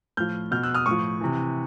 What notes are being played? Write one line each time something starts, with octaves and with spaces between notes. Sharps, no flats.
A2 F3 F6 G6
B2 F6 G6
E6 F#6
D#6 F6
A2 F3 C#6 D#6
C3 E3